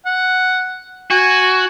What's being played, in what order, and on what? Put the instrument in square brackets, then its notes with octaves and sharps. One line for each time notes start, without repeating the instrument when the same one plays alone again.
[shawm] F#5
[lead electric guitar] F#4 [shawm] G#5